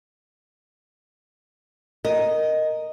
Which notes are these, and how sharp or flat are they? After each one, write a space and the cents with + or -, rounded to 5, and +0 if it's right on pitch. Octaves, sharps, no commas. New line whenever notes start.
A#4 +0 D#5 +0